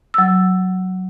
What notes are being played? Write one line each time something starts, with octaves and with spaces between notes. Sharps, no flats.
F#3 E6